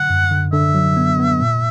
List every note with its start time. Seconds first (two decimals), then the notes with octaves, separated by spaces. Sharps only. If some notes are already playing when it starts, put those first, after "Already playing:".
Already playing: D3 F#3 F#5
0.10 F#2
0.31 D3
0.52 D3 E5
0.75 F#3
0.97 B3
1.19 B3
1.41 A#2